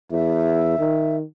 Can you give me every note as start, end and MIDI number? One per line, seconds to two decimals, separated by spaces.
0.12 0.78 40
0.12 1.17 76
0.79 1.23 51